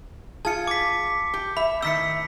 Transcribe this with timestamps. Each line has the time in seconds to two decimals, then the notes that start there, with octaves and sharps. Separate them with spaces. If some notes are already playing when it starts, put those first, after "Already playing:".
0.45 F4 G#4 A5 C#7
0.67 D6 B6
1.34 G4
1.57 E5 B5
1.82 A2 D#3 C4 E6 B6 C#7